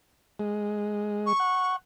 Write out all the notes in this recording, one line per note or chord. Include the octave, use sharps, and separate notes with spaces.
G#3
C#6
F#5